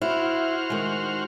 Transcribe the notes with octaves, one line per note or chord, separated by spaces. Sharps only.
E4 F#4 C5 F6
D#3 G#3